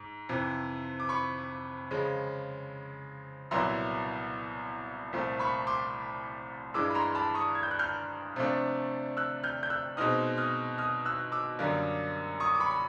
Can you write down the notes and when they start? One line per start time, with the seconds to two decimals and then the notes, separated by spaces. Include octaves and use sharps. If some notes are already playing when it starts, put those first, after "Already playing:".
Already playing: G#2
0.29 F2 C3 E3
1.00 D6
1.09 B5 C#6
1.91 C#3 F3 G#3
3.51 C2 A#2 F#3 B3 E4 A#5 C6
5.13 C2 A#2 F3 A3
5.39 B5 C#6
5.67 C6 D6
6.74 G2 E3 G#3 D6 E6
6.90 B5
6.94 A#5 C6
7.15 A5 B5
7.35 C#6 D#6
7.55 G#6
7.63 G6
7.71 F#6
7.79 F6 G6
8.36 C3 F3 A3 D4
9.17 E6 F#6
9.43 F6 G6
9.63 G6
9.70 E6 F#6
9.97 B2 G#3 C4 D#4 D#6 F6
10.37 D#6 F6
10.78 D#6 F6
11.05 E6 F#6
11.32 D6 E6
11.59 F#2 D3 G3 A#3
12.40 C#6 D#6
12.55 D6
12.60 B5 C#6
12.71 B5